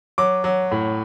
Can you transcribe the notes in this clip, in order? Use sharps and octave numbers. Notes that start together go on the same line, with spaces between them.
F#3 D6
F#3
A2